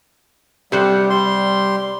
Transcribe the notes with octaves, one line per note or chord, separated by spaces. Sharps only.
C3 G3 C5 F#5
G3 C6